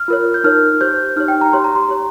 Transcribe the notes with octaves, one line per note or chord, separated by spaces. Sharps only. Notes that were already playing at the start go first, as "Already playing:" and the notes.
Already playing: F6
F4 A#4 C#5
G6
D#4 A#4 C#5 F6
G4 C5 G6
D#4 G4 C#5 F6
G5
A#5
G4 C#5 C6
A#5
C6
G4 C#5